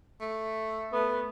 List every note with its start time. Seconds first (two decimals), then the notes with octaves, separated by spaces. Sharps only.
0.21 A3
0.93 A3 B3